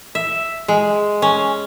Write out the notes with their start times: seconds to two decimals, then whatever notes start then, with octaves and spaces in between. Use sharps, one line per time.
0.15 E5
0.68 G#3
1.22 C#4